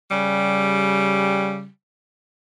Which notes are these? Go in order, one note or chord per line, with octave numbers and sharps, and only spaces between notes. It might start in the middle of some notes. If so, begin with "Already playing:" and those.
C#3 G3